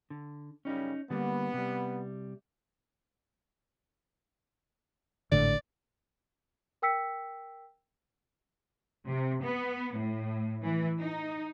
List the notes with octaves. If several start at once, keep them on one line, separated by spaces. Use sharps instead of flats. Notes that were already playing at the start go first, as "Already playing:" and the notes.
D3
F#2 C#3 G3 C#4 D#4
D3 G3 A#3 B3
C3 G3
G#1 A2 D3 D5
A#4 G5 E6 B6 C#7
C3
B3
A2
E3
D#4